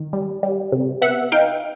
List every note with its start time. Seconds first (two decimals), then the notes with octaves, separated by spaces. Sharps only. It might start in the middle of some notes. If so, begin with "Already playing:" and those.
Already playing: D#3
0.13 G3
0.43 G3
0.72 C3
1.02 B3 E5 F#5
1.32 D#4 F5 G5